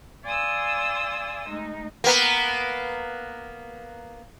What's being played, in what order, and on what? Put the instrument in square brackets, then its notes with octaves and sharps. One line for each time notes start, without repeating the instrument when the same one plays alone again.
[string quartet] D5 F5 G#5 C6 D#6 E6
G#3 A3 D#4
[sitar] A#3 B3